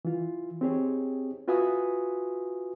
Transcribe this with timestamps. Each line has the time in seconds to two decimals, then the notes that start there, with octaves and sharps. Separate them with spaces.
0.05 E3 F4
0.61 C4 D#4 G4 G#4 C#5
1.48 F4 F#4 B4 E5 G#5 D#6